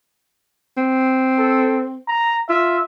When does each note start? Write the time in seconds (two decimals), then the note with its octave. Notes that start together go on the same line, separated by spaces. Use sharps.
0.77 C4
1.38 A4
2.07 A#5
2.49 F4 E5